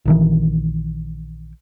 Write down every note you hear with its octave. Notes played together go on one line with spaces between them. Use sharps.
A#1 D#3 E3